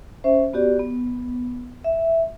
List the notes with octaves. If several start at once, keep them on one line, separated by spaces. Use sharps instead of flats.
C#4 C5 E5
B3 F#4 G4 D5
B3
E5